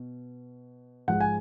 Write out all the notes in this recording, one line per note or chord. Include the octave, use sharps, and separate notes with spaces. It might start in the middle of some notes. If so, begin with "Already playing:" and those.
Already playing: B2
G#2 F3 G#3 F#5
G#5